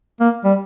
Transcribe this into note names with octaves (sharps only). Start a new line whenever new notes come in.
A#3
G3